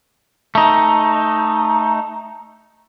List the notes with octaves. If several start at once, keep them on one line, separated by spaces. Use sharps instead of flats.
A3 D#4